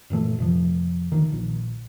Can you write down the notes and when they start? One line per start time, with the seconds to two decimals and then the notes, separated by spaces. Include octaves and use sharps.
0.10 F#1 A#2 E3 A3
0.38 F2 C3 F3
1.12 D2 D#3
1.32 A#1